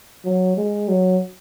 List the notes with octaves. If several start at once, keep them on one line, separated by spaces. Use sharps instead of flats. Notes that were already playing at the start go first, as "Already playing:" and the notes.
F#3
G#3
F#3